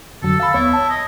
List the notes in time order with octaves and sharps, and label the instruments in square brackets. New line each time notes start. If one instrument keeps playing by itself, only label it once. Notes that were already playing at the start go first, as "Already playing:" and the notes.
[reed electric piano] F2 D3 F#3 [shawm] A4
[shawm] A4 [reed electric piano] F5 B5
[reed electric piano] D#2 B3 C#5 [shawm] E4
[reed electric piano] A5
[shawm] D#5